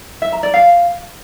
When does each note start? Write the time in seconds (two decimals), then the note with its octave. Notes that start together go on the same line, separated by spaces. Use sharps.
0.22 E5
0.32 A#5
0.43 D5
0.54 F5